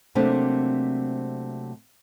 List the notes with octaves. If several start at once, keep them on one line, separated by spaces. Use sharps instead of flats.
C3 F#3 A3 A#3 C4 D4